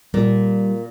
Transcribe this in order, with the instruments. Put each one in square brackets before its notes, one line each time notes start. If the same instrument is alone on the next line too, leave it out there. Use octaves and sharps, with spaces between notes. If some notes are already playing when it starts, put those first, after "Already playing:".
[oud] A#2 [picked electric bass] G3